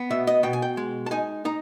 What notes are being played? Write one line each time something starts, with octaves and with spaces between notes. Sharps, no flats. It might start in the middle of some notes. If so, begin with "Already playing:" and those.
Already playing: B3
B2 E5
D#5
B2 G5
G#5
G5
G#3
A5
D#4 G#5
D#4 A#5